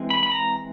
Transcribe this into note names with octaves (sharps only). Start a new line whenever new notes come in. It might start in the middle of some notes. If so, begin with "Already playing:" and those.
Already playing: E3 G#3 C4
B5
B5
A#5